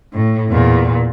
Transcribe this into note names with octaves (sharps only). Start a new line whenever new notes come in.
A2
E2 A#2